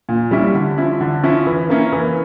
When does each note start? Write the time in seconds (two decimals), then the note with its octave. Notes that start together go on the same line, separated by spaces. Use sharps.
0.09 A#2
0.31 G3 C#4 E4
0.55 D3
0.78 F3 C#4 E4
1.01 D3
1.23 F3 C#4 E4
1.47 E3
1.70 A#3 C#4 E4
1.93 E3